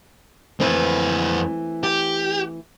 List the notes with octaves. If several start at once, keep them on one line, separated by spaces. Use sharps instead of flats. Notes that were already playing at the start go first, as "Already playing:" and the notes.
F2 E3 A3 C4 B4
G4